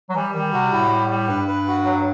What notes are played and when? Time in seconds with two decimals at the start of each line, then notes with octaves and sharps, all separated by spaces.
0.10 F#3
0.15 E3 G3
0.34 D#3 G3
0.53 C3 F#4
0.72 A2 E4
0.91 G3
1.10 G3
1.28 G2 B4
1.48 B4
1.67 F#4
1.85 F#3